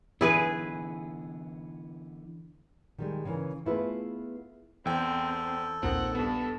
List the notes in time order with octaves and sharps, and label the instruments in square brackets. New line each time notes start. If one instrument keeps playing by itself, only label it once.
[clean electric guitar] D3 E3 B3 [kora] E4 G#4 B4
[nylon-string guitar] D#3 G3 G#3
C#3 E3 A#4
A3 B3 E4 F4 G#4 B4
[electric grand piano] E2 G5 [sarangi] C4 [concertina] A4
[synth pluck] A#1 D#2 [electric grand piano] C4 [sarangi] F#5
[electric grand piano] G2 B3 [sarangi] A4